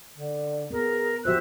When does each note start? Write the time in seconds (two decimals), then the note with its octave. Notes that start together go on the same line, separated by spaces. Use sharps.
0.16 D3
0.70 B3 G#4 A#4
1.25 F3 F#4 G4 C5 E5 E6 F#6